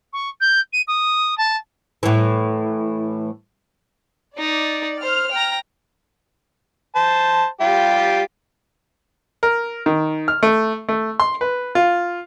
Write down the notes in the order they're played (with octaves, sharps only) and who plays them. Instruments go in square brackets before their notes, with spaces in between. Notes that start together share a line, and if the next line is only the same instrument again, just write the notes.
[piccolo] C#6
G6
D#7
D#6
A5
[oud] A2 E3
[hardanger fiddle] D#4 [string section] D5
[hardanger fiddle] C5 [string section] F6
[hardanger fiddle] G5 A#5
[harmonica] C5 A5
G3 F4 G4
[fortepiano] A#4
D#3
F6
A3
A3
C6
B4
F4